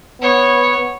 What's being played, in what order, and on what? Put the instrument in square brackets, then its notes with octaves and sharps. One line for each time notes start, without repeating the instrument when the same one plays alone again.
[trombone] B3 [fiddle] C#5